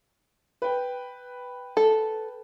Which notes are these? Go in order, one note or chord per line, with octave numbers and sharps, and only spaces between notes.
B4 G5
A4